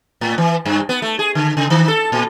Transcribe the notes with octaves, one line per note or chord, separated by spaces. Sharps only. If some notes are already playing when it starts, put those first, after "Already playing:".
A2
E3
G2
B3
A3
G#4
D3
C#3
D#3
A4
A#2